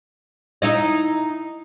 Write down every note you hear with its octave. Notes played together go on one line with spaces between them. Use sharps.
D#4 E4 D#5